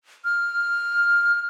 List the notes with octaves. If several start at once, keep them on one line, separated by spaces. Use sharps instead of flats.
F6